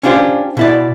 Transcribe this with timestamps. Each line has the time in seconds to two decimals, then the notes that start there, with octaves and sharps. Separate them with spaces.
0.03 C#4 D4 F4 G4 C5
0.57 B2 E4 D5